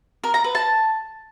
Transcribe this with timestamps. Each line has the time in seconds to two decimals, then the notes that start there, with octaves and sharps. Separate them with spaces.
0.24 A#4
0.34 A#5
0.44 B4
0.55 A5